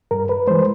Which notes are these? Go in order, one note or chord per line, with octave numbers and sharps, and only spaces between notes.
G2 A#4
B4
E3 G#3 C5